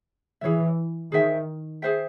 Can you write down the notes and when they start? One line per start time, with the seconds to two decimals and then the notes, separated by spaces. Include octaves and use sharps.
0.41 E3 G#4 C#5 E5
1.12 D#3 G#4 C5 E5 G5
1.82 G#4 C5 E5 G5